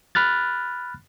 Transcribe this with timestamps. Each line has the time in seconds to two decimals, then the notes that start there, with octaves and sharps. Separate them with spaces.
0.15 B5 F6 F#6 A6